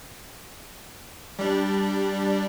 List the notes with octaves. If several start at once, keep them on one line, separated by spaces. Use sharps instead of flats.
G3 D4